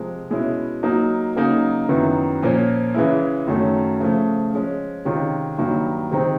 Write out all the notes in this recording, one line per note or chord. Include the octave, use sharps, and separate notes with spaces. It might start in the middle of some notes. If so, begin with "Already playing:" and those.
Already playing: C3 F3 G#3
B2 G#3 C#4 E4
F#3 A#3 D#4
C#3 F#3 A#3 D#4
F#2 D#3 F#3 B3 E4
A#2 F3 A#3 C#4
C#3 E3 G#3 C#4 E4
F#2 D#3 F#3 A3 C#4
C#3 F3 A3
F3 G#3 C#4
C3 D#3 G#3 C#4 F4
G2 D#3 F#3 A#3
C3 D#3 G#3 C4 D#4